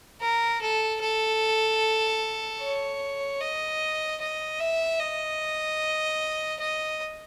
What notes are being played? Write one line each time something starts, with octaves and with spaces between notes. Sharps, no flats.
A#4
A4
A4
C#5
D#5
D#5
E5
D#5
D#5